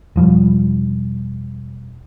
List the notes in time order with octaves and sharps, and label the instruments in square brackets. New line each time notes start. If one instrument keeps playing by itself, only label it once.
[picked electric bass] E1 F3 G3